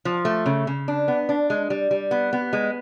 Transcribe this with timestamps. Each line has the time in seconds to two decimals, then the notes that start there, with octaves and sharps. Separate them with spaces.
0.05 F3
0.25 A3
0.46 C#3
0.67 C#3
0.88 D4
1.08 B3
1.29 D4
1.50 G#3
1.70 G3
1.91 G3
2.11 B3
2.33 B3
2.53 G#3